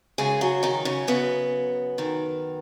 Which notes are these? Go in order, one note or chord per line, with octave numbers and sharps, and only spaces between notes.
F#2 C#3 G#3 G#4
F#3 F#4
D#3 D#4
C#3 C#4
F#2 C#3 B3
F#2 D#3